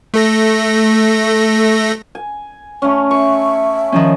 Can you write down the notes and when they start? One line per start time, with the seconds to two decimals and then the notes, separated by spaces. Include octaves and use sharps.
0.14 A3 A4 A#6
2.15 G#5
2.82 A3 C#4
3.11 E5 C#6
3.92 D#3 F3 C#4